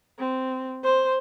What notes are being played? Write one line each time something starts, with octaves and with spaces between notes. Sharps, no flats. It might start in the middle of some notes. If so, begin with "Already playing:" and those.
C4
C5